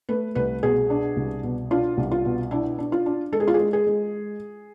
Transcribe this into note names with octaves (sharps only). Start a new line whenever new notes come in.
A3 B4
C2 B4
B2 G#4
D4
C2
B2
D4 F4
C2
F4
B2
D4 E4
D4
F4
D4
G#3 A4
G#4
F4
G#4
G#3
G#4
G#3